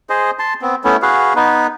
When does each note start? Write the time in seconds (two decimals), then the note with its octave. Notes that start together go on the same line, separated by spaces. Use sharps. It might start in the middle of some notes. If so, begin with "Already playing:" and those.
0.10 G#4 C5 D#5
0.39 A5 C6
0.62 B3 C4
0.84 A3 B3 C#4 E4
1.02 F#4 G#4 B4 F5
1.36 B3 D#4 B4